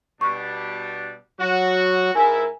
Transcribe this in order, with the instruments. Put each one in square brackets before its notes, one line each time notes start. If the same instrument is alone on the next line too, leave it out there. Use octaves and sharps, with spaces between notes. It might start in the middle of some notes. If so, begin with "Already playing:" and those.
[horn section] B2 G3 D4 [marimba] C#6
[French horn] F#3 [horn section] F#4
[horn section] G#2 E4 [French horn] A#4 [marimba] G#5